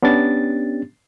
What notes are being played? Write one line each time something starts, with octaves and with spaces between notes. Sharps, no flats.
B3 C#4 D4 G4 A6